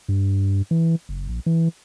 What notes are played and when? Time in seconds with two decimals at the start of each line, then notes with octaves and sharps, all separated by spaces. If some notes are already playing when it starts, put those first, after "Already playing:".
0.08 G2
0.71 E3
1.09 F#1
1.28 A#1
1.46 E3